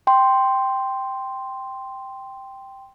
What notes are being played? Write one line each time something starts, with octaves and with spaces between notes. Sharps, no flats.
G5 C6